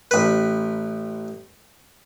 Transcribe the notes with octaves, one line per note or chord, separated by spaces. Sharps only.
A1 B4